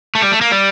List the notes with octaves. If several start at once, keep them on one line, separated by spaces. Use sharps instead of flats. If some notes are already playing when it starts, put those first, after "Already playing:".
A3
G3
A3
A#3
G3